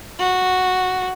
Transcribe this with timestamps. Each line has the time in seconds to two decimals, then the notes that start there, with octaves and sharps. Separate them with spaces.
0.19 F#4